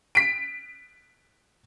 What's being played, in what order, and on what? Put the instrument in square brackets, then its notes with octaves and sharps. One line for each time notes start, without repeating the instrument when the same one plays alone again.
[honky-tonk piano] B6 D7